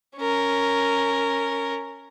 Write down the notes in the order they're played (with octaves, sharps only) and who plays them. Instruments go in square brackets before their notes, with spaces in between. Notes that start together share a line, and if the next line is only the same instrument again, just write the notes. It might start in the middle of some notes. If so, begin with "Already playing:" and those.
[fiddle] C#4 A#4